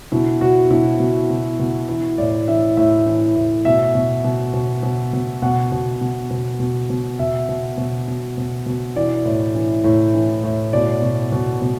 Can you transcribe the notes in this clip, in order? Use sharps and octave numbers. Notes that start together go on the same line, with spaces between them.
B2 E4
B2 F#4
B2 E4
B2
B2
B2
E3 E4
A2 D5
E3 E5
A2 E5
E3
A2
B2 E5
B2
B2
B2
B2
B2
B2 F#5
B2
B2
B2
B2
B2
B2 E5
B2
B2
B2
B2
B2
E3 D5
A2
E3
A2
E3
A2
B2 D5
B2
B2
B2